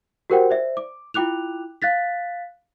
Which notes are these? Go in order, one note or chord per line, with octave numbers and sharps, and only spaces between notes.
F#4 G4 A#4 C5 F#5 G5
C5 D5 E5
D6
E4 F4 G5 D6 F#6 F7
F5 F#6 A6 B6